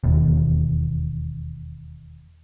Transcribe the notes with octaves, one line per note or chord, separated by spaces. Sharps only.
E1 D#2